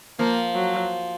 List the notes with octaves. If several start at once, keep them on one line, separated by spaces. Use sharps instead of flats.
F3 A#3
F#3